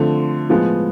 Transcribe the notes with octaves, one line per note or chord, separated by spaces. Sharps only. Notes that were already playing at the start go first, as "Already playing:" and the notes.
Already playing: D3 F3 A3 C4
A2 F3 G#3 B3